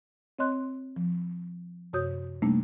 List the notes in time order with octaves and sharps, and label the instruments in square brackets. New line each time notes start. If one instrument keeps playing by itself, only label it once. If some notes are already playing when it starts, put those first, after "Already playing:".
[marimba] C4 C#5 D#5 C6 F#6
F3
F#2 C3 F#4 C#5 D#6 G6
C3 G3 A3 A#3 D4 D#4